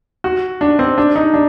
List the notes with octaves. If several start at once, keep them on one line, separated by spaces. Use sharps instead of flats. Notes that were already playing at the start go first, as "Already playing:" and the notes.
F#4
D4
C4
D4
D#4
D4